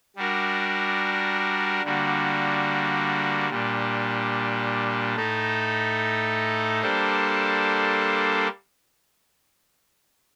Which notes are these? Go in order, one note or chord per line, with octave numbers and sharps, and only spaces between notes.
G3 D4 F#4 A#4
D3 G3 A#3 F#4
A#2 G3 D4
A2 A3 D#4 A4
G3 A#3 D4 A4 C5